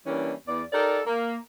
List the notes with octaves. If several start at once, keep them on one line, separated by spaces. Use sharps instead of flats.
E3 G3 A#3 C#4 D4
E2 D5
D#4 G4 A4 A#4 D5
A#3